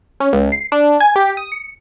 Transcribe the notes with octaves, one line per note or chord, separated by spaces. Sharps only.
C#4
C#2
C7
D4
G#5
G4
D#6
C#7